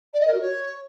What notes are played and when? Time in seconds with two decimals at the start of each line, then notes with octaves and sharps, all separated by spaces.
0.13 D5
0.20 D#5
0.27 A#4
0.34 F#4
0.40 C#5